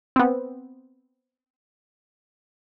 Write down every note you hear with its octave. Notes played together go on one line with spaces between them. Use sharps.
B3 C4